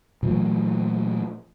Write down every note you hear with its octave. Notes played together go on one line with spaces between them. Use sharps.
A#2 E3 F#3 A3